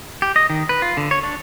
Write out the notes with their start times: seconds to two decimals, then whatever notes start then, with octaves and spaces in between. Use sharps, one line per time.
0.22 G4
0.36 D#5
0.50 D#3
0.69 B4
0.82 F4
0.97 D3
1.11 C#5
1.23 D4